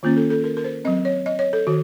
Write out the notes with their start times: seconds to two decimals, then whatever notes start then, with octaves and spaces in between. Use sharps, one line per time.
0.03 D#3 A#3 C#4 F4
0.17 A4
0.30 A4
0.44 A#4
0.57 A#4
0.64 C5
0.85 C4 D#5
0.87 F#3
1.05 C#5
1.26 D#5
1.39 C#5
1.53 A4
1.67 D#3 F#4